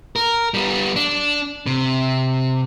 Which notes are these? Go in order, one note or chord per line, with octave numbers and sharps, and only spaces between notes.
A#4
G3 B3
D4
C3